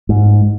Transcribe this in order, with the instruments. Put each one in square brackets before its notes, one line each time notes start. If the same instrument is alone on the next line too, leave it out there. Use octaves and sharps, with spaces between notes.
[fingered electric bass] G#2